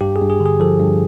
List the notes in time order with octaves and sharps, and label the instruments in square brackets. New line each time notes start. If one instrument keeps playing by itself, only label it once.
[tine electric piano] G2 G4
G#4
G2
G#4
D3
G#4
F3 A4
G2